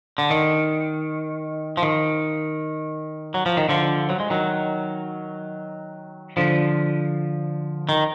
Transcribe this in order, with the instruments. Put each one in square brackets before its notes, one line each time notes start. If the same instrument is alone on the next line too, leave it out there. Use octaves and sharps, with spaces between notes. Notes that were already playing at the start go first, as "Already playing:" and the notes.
[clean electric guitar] D3
D#3
F3
D#3
F#3
F3
D#3
D3 F3
F#3
G#3
D#3 F#3
D3 F3
D#3